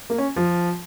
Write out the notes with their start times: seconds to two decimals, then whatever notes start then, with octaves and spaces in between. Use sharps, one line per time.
0.10 A#3
0.18 C#4
0.36 F3